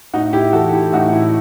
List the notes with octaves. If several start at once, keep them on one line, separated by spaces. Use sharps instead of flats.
A2 D#4 F#4
E4 G4
E3 F#4 A4
E4 G4
A2 D#4 F#4
E4